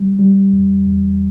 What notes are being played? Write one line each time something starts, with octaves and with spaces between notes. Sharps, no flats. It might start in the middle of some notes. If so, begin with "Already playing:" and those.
Already playing: G3
G3
E2
E2